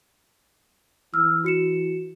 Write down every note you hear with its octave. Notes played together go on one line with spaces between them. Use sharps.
E3 E6 F6
F#4 C#7 E7